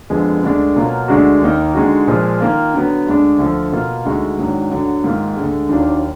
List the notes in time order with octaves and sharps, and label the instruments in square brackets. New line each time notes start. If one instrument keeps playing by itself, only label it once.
[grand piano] F2 D3 F3 G#3 B3
D2 D3 G#3 D4
B2 F#3 A#3 F4
D2 D3 G#3 D4 F#4
D#2 D#3 A#3 D#4
D3 G#3 D#4 F#4
A#2 F3 G#3
D#3 A#3 F4
D3 F#3 B3
D2 D3 G#3 D4
D2 D3 F3
B2 A#3 F4
D2 D3 G#3 D#4 F#4
G#2 D#3 F#3 D4
D2 D3 F#3
G#2 D#3 A#3 F4
D2 D3 G#3
D#2 D#3 F#3 D4 F4